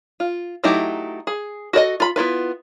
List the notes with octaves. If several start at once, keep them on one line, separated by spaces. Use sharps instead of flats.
F4
F#3 A3 D#4 E4 G4
G#4
F#4 A4 D5 D#5
F4 B5
B3 E4 F4 B4